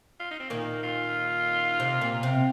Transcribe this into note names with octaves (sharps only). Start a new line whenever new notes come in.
F4
D#4
C4
A#2 D#3 A#3
F4
C3
A#2
C3